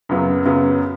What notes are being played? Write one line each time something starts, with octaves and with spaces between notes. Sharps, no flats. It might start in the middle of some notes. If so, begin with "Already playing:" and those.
F#2 C#3 F#3 B3
F#2 C#3 F#3 B3